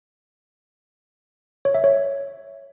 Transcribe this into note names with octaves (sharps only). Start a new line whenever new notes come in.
C#5
E5
C#5